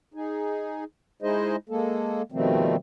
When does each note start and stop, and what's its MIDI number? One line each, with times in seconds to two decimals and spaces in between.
0.14 0.84 63
0.14 0.84 68
1.22 1.56 56
1.22 1.56 63
1.22 1.56 64
1.22 1.56 68
1.22 1.56 72
1.22 1.56 75
1.69 2.22 56
1.69 2.22 58
1.69 2.22 69
2.32 2.76 47
2.32 2.76 51
2.32 2.76 53
2.32 2.76 55
2.32 2.76 57
2.32 2.76 60